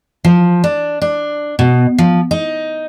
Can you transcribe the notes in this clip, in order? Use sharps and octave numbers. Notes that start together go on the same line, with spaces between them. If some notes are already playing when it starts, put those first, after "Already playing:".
F3
D4
D4
B2
F3
D#4